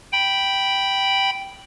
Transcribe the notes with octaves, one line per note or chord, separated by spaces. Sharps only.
G5 B5